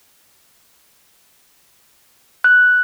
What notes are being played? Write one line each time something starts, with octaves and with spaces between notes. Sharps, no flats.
F#6